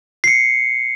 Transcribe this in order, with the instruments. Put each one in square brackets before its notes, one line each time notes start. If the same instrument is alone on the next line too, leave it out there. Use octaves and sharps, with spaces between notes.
[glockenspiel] C7 C#7